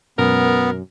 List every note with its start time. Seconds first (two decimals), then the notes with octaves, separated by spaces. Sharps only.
0.18 F#2 B2 G#3 B3 A#4